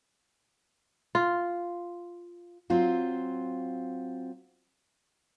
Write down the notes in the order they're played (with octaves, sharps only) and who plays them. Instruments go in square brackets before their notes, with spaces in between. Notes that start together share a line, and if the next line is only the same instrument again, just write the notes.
[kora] F4
[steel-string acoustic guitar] F#3 C4 F4